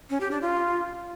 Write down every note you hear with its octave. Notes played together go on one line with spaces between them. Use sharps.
C#4
G4
D4
F4